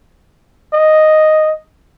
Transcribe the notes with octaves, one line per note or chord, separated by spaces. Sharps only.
D#5